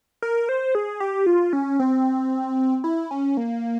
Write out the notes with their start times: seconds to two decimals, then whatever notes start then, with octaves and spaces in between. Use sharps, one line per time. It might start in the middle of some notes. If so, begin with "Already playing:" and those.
0.22 A#4
0.49 C5
0.75 G#4
1.00 G4
1.26 F4
1.53 C#4
1.79 C4
2.84 E4
3.11 C#4
3.37 A#3